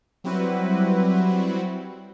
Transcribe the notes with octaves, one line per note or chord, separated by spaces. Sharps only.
F#3 G3 C4 E4 F#4 B4